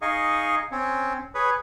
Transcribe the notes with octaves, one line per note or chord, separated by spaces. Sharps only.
D#4 G#4 D#5 F5 C#6
C4 C#4
G#4 B4 C#5